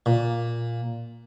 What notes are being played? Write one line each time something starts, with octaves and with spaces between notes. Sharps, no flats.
A#2